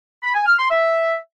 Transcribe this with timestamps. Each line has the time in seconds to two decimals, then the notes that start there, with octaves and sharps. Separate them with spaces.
0.23 B5
0.34 G#5
0.46 F6
0.58 C6
0.70 E5